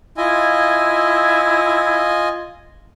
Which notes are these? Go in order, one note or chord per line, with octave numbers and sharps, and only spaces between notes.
E4 F4 D#5 G#5